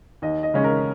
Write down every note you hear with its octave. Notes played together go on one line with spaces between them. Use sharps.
D#2 D#5
D#5
C#3 G#3 C#4
A#4